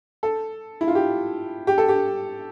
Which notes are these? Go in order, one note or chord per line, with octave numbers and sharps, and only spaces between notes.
A4
E4
F4
G4
G4
A4
G4